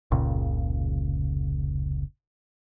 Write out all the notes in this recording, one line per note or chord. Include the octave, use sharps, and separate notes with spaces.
F1 C#2 A#2 C#3